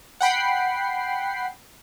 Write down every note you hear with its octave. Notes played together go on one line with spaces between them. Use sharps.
F#5 G5 B5 C7